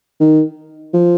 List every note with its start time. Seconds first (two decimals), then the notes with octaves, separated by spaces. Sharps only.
0.20 D#3
0.94 F3